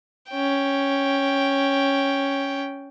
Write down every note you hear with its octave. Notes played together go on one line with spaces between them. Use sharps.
C#4 G5